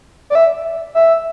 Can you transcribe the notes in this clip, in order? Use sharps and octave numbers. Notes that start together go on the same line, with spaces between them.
D5
E5
E5